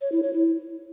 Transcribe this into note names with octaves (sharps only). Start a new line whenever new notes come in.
C#5
E4
C#5
E4